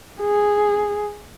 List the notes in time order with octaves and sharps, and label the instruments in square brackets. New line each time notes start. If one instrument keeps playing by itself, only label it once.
[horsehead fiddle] G#4